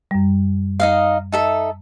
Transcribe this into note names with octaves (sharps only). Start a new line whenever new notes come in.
F#2 G3
D#4 D#5 F5
D#4 A4 E5